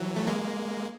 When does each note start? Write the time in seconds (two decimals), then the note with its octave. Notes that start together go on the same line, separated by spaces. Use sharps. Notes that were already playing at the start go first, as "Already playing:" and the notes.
Already playing: E3 F#3
0.16 A3
0.27 G#3 A#3